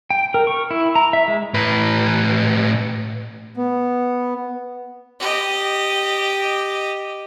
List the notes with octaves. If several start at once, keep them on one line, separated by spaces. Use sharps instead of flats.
G5
A#4
C#6
E4
A#5
E5
G#3
A2 B4
B3
G4 D#5